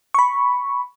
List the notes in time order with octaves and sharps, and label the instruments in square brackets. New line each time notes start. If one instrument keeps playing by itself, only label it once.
[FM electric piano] B5 C#6